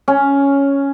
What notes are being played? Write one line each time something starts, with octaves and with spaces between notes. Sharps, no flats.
C#4